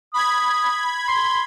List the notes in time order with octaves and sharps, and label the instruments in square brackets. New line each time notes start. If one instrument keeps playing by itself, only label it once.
[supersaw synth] B5 G#6 [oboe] D#6
[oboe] C6